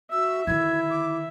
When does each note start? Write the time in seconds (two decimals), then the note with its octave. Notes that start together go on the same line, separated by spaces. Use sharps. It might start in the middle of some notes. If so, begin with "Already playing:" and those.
0.12 F#4 E5 E6
0.47 D3 D#3 E4 G#6
0.90 D6